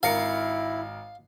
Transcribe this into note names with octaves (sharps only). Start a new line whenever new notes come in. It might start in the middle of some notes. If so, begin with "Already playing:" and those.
G#1 E4 A#4 F5 C#7